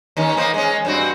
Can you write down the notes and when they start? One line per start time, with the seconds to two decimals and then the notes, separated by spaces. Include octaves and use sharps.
0.17 D#2 D#3 C#4
0.37 A#3 B3 C5
0.54 G#3 C#4
0.85 G2 C4 F#4